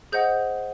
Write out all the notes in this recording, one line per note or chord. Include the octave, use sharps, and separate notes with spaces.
G#4 C5 D#5 F#5 G6